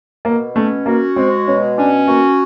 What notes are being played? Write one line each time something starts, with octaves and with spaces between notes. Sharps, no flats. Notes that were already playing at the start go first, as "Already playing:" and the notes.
B2 A#3
A3 C#4
A#3 F#4
G#3 C4
B2 C#4
C#4 D4
A#3 F#4